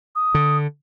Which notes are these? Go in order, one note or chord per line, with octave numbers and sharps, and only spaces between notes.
D#6
D3